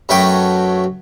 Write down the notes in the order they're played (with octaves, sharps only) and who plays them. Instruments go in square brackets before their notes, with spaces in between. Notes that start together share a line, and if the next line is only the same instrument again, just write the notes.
[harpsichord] F#2 F#3 A3 B4 G5 D6